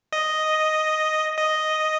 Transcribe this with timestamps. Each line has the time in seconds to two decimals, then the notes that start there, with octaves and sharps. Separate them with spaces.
0.12 D#5
1.37 D#5